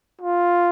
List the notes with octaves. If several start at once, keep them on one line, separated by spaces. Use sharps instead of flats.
F4